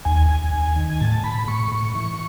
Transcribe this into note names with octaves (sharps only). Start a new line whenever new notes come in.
D#2 G#5
D#2
D#2
D#3
A2 A5
A2 B5
A2 C#6
A2
E3